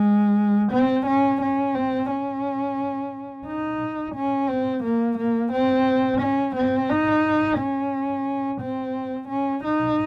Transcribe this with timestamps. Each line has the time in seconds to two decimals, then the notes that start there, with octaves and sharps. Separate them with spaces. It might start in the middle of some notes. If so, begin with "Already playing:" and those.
Already playing: G#3
0.72 C4
1.07 C#4
1.42 C#4
1.75 C4
2.10 C#4
3.46 D#4
4.15 C#4
4.49 C4
4.84 A#3
5.18 A#3
5.53 C4
6.21 C#4
6.56 C4
6.90 D#4
7.58 C#4
8.61 C4
9.29 C#4
9.64 D#4